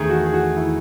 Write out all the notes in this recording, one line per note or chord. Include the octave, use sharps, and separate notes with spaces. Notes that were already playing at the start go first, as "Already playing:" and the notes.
Already playing: E2 D#3 A3 G#4
F#4
G#4
F#4
E4